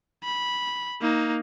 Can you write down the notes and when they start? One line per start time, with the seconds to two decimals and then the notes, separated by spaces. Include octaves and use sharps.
0.24 B5
1.01 A#3 D#4